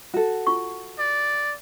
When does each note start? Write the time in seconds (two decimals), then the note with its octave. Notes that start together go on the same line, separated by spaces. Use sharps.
0.14 F#4 A4
0.47 F4 C#6
0.99 D5